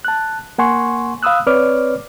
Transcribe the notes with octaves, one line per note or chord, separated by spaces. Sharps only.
A5 F#6
A#3 F#5 G#5 C6 C#6
F5 B5 D#6 E6 F#6
C4 B4 C#5 D5 D6 F6